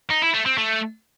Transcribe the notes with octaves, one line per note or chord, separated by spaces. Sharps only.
D#4
E4
A3
C4
A3